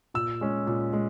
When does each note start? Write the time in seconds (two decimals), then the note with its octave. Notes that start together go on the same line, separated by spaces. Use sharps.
0.14 A#2 E6
0.41 G#3 C#4
0.67 A#2
0.93 G#3